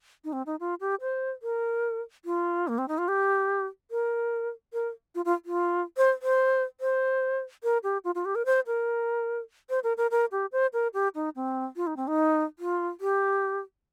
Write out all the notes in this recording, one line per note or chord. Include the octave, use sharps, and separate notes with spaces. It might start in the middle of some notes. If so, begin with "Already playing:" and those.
D#4
C4
D#4
F4
G4
C5
A#4
F4
A#3
C4
D#4
F4
G4
A#4
A#4
F4
F4
F4
C5
C5
C5
A#4
G4
F4
F4
G4
A#4
C5
A#4
C5
A#4
A#4
A#4
G4
C5
A#4
G4
D#4
C4
F4
D#4
C4
D#4
F4
G4